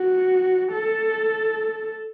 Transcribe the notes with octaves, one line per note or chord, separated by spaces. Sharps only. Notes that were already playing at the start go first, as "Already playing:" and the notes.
Already playing: F#4
A4